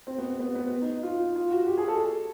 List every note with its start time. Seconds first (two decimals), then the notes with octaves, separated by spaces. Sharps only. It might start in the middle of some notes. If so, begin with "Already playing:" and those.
0.07 C4
0.18 B3
0.39 B3
0.55 B3
0.82 D#4
1.03 F4
1.36 F4
1.52 F#4
1.67 G4
1.77 G#4
1.88 A4